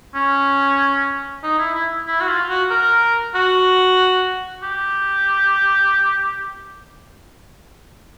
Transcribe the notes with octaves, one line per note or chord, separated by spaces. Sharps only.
C#4
D#4
E4
E4
E4
F#4
F4
F#4
A#4
F#4
G4